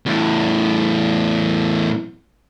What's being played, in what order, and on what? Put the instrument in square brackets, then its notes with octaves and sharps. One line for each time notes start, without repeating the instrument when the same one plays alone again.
[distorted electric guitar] E2 A2